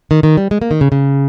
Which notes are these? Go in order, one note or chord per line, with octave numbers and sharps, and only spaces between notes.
D#3
D#3
G3
G#3
A#3
D#3
C#3
C#3